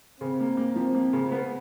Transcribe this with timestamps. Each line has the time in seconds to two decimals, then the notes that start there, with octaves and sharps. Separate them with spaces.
0.20 C#3 C4
0.40 A#3
0.57 A#3
0.76 F3 C4
0.94 A#3
1.13 C#3
1.32 B3